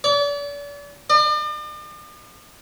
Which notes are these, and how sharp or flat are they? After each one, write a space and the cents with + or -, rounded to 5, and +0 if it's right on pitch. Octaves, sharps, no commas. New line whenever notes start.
D5 -40
D5 +45